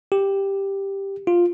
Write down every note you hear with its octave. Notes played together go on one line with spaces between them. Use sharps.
G4
F4